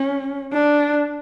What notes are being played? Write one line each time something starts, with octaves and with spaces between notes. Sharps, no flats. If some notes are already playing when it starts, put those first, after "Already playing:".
Already playing: C#4
D4